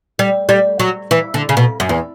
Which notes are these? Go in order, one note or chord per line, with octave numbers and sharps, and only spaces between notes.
G3
G3
F#3
E3
D3
C#3
B2
F#2
E2